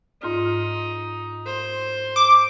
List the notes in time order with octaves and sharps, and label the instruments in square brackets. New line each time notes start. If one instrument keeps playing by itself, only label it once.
[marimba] G#2 F4 F6 [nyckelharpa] D#4
[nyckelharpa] C5
[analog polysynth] D6